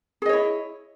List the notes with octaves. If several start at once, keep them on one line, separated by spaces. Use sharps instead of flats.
E4 G#4 C#5 D#5